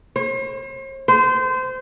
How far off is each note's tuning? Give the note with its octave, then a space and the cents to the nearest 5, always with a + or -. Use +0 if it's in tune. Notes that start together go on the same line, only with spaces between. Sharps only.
C5 +45
C5 -25